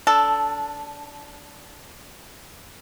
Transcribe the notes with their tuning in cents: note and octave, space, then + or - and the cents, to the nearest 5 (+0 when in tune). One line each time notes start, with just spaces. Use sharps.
D4 -20 A4 +0